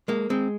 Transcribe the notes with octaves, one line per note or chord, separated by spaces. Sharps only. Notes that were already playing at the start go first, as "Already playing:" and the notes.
G#3 A#3
G#3 C4